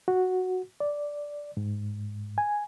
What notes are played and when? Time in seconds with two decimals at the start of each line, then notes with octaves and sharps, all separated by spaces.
0.08 F#4
0.80 D5
1.57 G#2
2.38 G#5